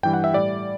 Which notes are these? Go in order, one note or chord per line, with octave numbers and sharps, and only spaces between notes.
G2 E3 G3 G5
F#5
E5
A2 G3 D5